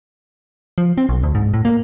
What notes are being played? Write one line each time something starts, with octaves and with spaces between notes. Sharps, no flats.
F3
C4
B1
D2
G#2
A2
A#3